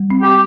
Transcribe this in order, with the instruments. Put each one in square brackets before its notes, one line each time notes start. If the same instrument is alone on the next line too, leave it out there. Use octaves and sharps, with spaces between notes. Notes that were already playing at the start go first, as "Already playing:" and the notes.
Already playing: [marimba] G3
C4
[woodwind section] G4